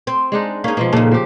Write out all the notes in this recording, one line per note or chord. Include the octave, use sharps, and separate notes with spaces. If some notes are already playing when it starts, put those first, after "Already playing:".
C4
G#3 D4 D#4
A#3 C#4 D#4 G#4
B2 F3 G#3 A#3
A#2 C#3 A#3 D#4 A4
F3 G4